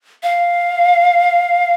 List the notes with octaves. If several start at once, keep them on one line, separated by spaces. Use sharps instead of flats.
F5